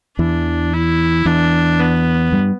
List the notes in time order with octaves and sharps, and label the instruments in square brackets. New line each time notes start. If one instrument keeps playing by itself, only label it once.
[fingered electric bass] E2 E3 [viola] D4
[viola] E4
[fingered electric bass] E2 E3 [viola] D4
[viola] B3
[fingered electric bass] G2 G3